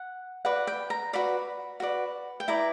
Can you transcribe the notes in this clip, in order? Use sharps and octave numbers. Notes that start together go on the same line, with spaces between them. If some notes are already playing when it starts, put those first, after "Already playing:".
Already playing: F#5
F#4 B4 D5 F#5
G5
A#5
F#4 B4 D5 B5
F#4 B4 D5
G5
E4 B4 D5 A#5